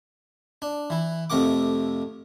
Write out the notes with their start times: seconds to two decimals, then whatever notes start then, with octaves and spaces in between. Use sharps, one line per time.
0.62 D4
0.90 E3 E4
1.30 F2 C3 A3 A#4 F#5 D6